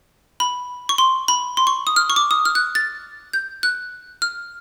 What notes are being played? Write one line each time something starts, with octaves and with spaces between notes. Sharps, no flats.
B5
C#6
C6
B5
C6
C#6
D#6
F6
C#6
D6
D#6
F6
F#6
A6
G6
F#6
F6